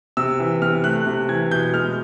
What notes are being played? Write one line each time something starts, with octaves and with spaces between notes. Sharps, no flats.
C3 E6
E3
C3 F6
A3 F#6
C3
E3 G#6
B2 G6
G#3 F6